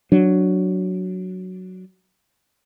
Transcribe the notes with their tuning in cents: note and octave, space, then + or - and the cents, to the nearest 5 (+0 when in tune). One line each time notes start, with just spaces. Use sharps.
F#3 +0 D4 +0